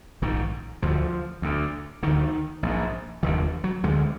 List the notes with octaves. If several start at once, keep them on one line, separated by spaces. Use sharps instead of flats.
A#1 G#2 D#3
D2 D3 F3
D2 D3
D2 D3 D#3
A#1 G#2
F1 D#2 D3 D#3
F#3
D2 D3 G#3